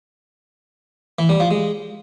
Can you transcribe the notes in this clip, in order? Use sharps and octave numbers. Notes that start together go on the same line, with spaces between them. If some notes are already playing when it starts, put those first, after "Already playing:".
E3
G3
F3
G#3